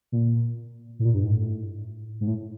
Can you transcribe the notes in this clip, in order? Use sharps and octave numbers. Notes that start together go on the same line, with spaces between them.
A#2
A2
A#2
G2
G#2
A2
G#2
A2